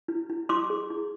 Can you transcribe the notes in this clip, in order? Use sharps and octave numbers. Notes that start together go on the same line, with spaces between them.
E4
E4
E4 C6 D6
G#4
E4